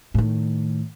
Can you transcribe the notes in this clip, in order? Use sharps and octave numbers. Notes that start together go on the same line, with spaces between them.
A2 D#3